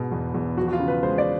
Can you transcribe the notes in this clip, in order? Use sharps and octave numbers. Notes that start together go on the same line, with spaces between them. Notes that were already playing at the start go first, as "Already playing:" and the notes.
Already playing: G#2 B2 G#3
E2
E2
F3 F#4
F#4
F4
C#3
B4
G#3 C5
D5